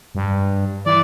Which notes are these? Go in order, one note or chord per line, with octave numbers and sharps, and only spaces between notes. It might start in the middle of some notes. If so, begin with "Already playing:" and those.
G2
E3 D5